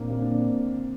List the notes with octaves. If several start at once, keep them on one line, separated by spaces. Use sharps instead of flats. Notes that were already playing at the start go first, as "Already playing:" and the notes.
Already playing: A#2 A#3 C4 D4
A#3
D4
C4